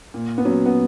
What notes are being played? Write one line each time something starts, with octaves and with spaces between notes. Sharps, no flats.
A#2
B3
F#3 C#4
B3